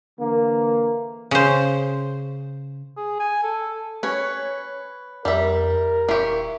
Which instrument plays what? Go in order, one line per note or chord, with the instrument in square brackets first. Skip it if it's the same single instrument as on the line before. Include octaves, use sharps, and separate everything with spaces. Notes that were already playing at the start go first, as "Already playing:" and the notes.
[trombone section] D3 E3 A#3
[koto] C#3 C5
[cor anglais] G#4
G#5
A4
[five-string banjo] C#4 [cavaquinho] B4 C#5
[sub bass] F2 [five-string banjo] G3 E5 [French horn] A#4
[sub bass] D#1 [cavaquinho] E4 C6 C#6 [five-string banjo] F4 G4